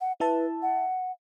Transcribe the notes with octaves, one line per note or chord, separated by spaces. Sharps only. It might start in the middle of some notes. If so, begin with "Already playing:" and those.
F#5
E4 B4 E5 A5
F#5